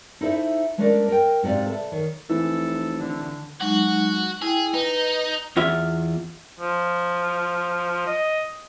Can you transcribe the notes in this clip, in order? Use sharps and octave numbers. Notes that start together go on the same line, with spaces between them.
D#4 E4 A4 C5 C#5 E5
G#3 A3 C#4 D4 A#4 D5
A#4 G5
G#2 C3 F#4 D5 F5
A4 B4 E5
D#3 C#5
F1 E3 A4
D3
F#3 G#3 D#4 F#4
E4 G#4 G5
D#4 B4
E2 F4 E5
F3
D#5